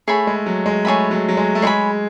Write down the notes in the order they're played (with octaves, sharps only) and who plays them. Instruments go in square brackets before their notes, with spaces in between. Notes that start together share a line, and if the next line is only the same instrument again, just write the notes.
[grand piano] A3 [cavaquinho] G#4 C#5 G#5 B5
[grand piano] G#3
F#3
G#3
[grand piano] A3 [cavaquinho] G#4 C#5 G#5 B5
[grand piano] F#3
F#3
G#3
A3
[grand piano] G#3 [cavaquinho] G#4 C#5 G#5 B5